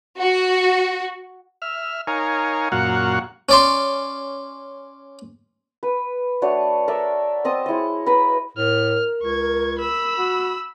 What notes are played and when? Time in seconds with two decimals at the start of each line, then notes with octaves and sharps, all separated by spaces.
0.19 F#4
1.62 E5 F6
2.07 D#4 A#4 C#5 F5 G#5
2.72 F#2 A#2 F#4 F5 F#5 C#6
3.49 C#4 D5 C6
5.83 B4
6.42 A3 D4 F#4 C#5
6.88 A4 A#4 D5 E5
7.45 C4 D#5 A5 D#6
7.66 G#3 E4 C#5 D#5
8.06 B4 A#5 B5
8.57 A2 A#4 F6
9.23 C#2 C#6 G#6
9.79 B5 E6
10.18 F#4